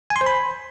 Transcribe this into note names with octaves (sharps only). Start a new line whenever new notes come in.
G#5
C6
C5
B5